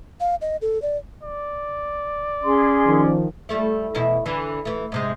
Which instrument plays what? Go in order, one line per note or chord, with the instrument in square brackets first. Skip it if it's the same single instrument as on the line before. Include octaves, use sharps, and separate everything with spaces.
[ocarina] F5
D#5
A4
D5
[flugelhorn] D5
[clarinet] C#4 [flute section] G#4 C6
[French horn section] D#3 F3
[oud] G3 A3 E4
E2 B2 E4
D3 E3
E3 A3
G#2 C3 G#3